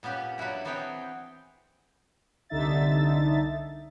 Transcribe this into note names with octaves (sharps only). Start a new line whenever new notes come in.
A#2 B3 C#4 G4 B4
F#3 B3 D4 E4 F#4
E3 B3 C4 G#4 C#5 G5
C2 D3 D#4 E5 A6